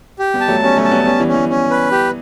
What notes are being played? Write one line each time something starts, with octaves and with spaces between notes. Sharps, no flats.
G4
G3 B3
A5
F#3 A3
G3 B3 C#4
F#3 A3
A5
G3 B3
G3 B3 C#4
E3 G3
C#4
E3 G3
C#4
B4
G4